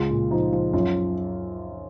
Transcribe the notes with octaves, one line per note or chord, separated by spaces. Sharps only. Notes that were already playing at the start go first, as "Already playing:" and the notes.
Already playing: C#2 G#3 F4
A#2
F3 D#4
F3
F#2 F4